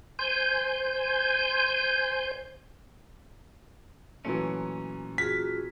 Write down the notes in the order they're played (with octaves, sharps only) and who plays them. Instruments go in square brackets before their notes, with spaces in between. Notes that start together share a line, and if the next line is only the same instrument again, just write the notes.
[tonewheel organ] C5 G#5 G6
[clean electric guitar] A#2 C#4 [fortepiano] E3 F#3 A3
[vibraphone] F4 F#4 G#4 [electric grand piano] B6